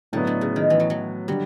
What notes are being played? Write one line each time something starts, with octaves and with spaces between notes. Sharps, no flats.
A2 D3 F#3 B3
D3
C#3
D#3
E3
F#3
F#3
D3 F#3 G3